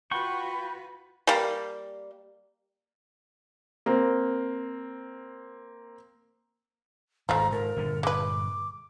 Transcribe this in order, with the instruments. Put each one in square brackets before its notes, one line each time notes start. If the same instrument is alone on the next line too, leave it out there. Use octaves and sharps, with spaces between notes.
[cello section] F4 F#4 B4 [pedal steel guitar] F#5 G5 C#6 [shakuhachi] B5
[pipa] G3 A#3
[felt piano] A#3 C4
[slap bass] G#1 G#2 [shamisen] F3 A3 [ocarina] A#5
[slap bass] G#2 [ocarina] A#4
[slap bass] G1 A#2 D3
[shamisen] G#3 B4 [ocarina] D6